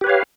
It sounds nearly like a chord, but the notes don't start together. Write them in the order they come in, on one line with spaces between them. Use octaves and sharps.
G4 B4 C#5 F5